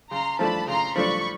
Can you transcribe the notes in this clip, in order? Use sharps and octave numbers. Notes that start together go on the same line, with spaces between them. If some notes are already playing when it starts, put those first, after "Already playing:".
C#3 A#5 C6
F3 A3 D4 A5 B5
C#3 A#5 C6
F3 A3 D4 B5 C#6